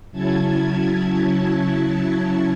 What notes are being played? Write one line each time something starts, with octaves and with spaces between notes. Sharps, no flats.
C#3 F#3 C#4 E4 A5 G#6